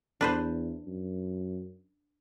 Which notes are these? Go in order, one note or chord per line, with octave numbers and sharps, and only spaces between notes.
E2 D4 B4 C5
F#2